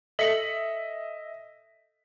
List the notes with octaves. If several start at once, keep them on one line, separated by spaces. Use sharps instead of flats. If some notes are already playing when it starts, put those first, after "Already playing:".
A4 D#5 E5 B6 C#7 F#7